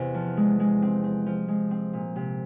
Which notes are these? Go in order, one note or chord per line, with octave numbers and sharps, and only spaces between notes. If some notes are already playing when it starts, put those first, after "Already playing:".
Already playing: E2 C3
F3
G#3
G#3
C4
C4
F3
G#3
C4
A#2
C3